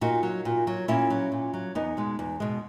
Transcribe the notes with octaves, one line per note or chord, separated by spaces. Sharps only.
A#2 D#4 F#4
F#3
A#2
F#3
A#2 C#4 E4
F#3
A#2
F#3
E2 B3 D#4
B2 G#3
E2
B2 G#3